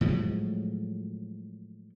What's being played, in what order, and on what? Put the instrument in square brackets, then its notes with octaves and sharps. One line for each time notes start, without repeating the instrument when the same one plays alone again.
[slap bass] A2 F3 F#3 G#3